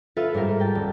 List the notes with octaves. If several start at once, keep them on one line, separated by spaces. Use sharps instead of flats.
F4 A4 B4 E5
G#2 G3 F4 A#4
G5 A5
D#1